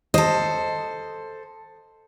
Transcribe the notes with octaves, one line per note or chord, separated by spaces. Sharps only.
A4 C5 D#5